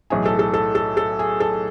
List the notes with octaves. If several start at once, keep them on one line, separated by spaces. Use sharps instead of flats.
B1 A2 E3 G#4
A4
A4
A4
A4
A4
G#4
A4